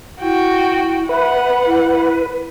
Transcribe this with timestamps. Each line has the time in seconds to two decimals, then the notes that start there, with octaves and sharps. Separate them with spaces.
0.22 E4 F#4 G5
1.09 B4 E5 F#5
1.66 E4